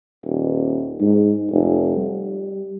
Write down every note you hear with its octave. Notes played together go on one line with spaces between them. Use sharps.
D#1
G#2
F1
G3